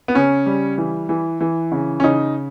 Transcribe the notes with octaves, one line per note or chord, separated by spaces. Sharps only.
B3
C#3 C#4
G3
E3
E3
E3
C#3
C#4
C#3 D#4